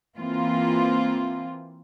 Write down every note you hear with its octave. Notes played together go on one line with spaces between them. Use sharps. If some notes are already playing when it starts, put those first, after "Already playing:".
E3 A#3 C4 F4